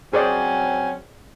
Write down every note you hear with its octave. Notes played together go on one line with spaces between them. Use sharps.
F#3 C4 C#4 G#4 C5 D5